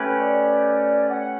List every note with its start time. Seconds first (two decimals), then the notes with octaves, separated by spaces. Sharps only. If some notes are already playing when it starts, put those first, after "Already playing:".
Already playing: A3 C#4 G4 B4
0.19 D5
1.10 F#5